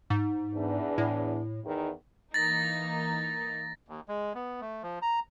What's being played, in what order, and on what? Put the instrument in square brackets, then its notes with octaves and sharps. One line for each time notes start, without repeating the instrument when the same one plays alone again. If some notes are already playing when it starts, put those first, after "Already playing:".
[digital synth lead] G#2
[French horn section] E2 D4
[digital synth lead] A2
[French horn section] E2 D#3
[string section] E3 A#3 D#4 [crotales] A6 A#6
[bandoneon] D#2
G#3
B3
A3
F3
A#5